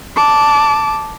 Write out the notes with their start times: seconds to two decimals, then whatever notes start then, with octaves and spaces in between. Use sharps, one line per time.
0.16 A5 D6